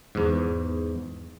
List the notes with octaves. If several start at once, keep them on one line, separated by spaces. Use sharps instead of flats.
E2 G#2